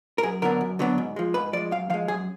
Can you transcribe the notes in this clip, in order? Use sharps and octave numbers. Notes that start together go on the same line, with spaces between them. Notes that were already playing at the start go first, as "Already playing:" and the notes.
A#4
F#2 G#4
D3 F#3 B3 D4 A#4
F#2
D3 F#3 B3 D4
G#2
F3 G#3
G#2 B4
F3 G#3 D5
F#2 F5
F3 G#3 F5
F#2 G#4